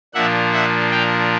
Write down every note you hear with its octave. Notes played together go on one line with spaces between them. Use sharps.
A#2 F3 A#3 D4 E5 F#5
E5 F#5
F5 G5